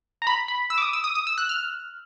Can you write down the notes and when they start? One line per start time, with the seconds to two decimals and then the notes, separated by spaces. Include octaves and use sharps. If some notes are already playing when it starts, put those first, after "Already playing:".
0.22 A#5
0.27 B5
0.48 B5
0.70 E6
0.78 D6
0.82 D#6
0.93 E6
1.04 D#6
1.15 D#6
1.27 E6
1.38 F#6
1.49 F6